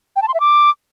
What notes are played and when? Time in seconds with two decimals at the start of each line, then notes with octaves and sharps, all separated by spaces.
0.16 G5
0.22 A5
0.28 C6
0.34 E5
0.40 D6